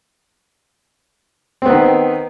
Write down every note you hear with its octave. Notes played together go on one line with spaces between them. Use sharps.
D#3 B3 C4